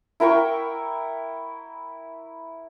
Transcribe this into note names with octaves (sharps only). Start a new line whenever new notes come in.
E4 A#4 G5 C#6